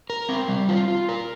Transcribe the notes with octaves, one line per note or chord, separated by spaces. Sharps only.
A#4
C4
G3
F4
F4
A#4